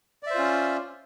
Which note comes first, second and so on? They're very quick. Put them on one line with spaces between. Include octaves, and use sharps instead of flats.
D5 E5 C5 F4 C#4